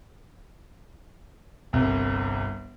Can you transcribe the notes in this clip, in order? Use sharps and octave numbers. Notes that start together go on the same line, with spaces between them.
G1 C2